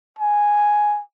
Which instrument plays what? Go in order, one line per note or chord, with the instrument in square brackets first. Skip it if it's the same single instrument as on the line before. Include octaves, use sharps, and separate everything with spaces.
[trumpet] G#5